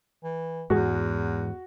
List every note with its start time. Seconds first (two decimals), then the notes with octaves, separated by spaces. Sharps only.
0.24 E3
0.70 E2 G#2 E3 G#3 F#4 G#4